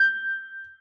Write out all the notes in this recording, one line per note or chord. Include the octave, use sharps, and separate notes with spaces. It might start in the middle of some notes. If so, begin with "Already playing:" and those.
Already playing: G6